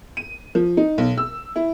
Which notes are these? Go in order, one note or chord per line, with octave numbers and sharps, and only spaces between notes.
D#7
F3
D#4
B1
E6
E4